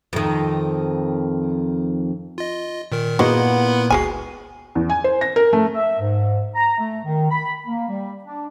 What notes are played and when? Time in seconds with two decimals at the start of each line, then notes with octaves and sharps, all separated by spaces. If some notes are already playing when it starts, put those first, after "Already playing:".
0.13 F2 D#3
2.38 F4 D#5
2.92 A#2 D#3 A#4
3.19 A#2 B3 E4 F#4 G#4 D#5 F#5 C6
3.90 G1 C#2 F#4 G#4 G#5 C7
4.75 E2
4.90 G#5
5.04 C5
5.21 A#6
5.36 A#4
5.53 A3
5.75 E5
6.00 G#2
6.56 A#5
6.78 A3
7.04 D#3
7.31 B5
7.67 A#3
7.89 G3
8.25 D4